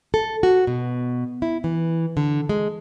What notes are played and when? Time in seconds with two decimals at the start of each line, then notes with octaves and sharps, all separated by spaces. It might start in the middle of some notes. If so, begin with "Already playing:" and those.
0.14 A4
0.43 F#4
0.67 B2
1.42 E4
1.64 E3
2.17 D3
2.49 G#3